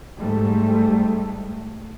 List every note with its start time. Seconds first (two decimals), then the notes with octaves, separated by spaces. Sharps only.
0.18 G#2 G3 A3